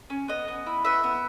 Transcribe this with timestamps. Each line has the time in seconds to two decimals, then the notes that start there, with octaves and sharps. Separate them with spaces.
0.10 C#4
0.28 B3 D#5
0.48 B3
0.66 E4
0.85 B3 E5
1.04 B3